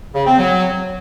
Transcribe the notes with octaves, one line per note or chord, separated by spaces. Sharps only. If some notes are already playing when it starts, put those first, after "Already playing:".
C#3
C4
F#3